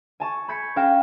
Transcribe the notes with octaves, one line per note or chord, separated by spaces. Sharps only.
G#5 A5 C#6
B5 G6 G#6 B6 C#7
C#4 F5 G5 F6 A#6 E7